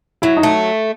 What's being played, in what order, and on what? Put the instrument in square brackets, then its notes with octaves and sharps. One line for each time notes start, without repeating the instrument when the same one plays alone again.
[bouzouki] F#3 [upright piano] E4
[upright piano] D#4
[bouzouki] A3